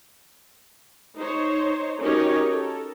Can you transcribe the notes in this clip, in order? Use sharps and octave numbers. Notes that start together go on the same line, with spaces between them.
D#4 C5 C#5
C#4 D#4 F#4 G4 A#4 C#5
A4 A#4